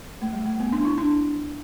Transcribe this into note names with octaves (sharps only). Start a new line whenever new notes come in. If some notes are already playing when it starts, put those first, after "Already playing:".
A3
G3
A3
B3
D4
E4
D4